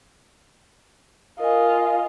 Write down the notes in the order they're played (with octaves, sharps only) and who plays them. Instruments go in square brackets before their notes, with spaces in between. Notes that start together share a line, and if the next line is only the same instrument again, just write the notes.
[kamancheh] F4 D#5 [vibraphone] A#4 G#5